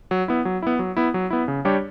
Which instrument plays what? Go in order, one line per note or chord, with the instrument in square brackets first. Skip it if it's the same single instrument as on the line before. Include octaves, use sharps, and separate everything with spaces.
[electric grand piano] F#3
B3 E4
F#3
B3 E4
F#3
B3 E4
F#3
B3 E4
C#3
G3 D4 G4 C#5